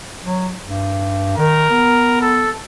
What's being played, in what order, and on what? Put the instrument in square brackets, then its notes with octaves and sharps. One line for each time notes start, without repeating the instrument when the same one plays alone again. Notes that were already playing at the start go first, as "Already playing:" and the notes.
[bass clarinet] F#3
G2
[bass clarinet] D#3 [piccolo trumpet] A#4
[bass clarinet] B3
[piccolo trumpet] A4